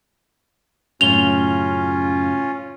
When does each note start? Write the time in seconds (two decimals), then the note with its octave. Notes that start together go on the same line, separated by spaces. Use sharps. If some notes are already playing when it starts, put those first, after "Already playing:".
1.01 F#2 A2 C#3 C#4 F4 F7 G7